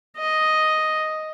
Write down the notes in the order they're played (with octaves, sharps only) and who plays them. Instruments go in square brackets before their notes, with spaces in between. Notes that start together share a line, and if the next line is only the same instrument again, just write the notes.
[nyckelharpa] D#5